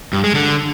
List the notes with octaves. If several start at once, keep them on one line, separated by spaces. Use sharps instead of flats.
G2
G#3
D3